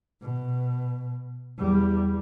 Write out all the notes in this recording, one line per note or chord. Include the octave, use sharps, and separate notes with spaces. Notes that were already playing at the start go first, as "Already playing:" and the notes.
B2
E2 G3